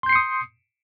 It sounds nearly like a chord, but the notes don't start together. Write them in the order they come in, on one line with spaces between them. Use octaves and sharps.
C6 G6 C7 C#7 D#6